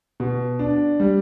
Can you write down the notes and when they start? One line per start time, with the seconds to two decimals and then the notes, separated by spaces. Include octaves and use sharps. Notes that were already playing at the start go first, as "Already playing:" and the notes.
0.20 B2
0.59 D4
1.00 G3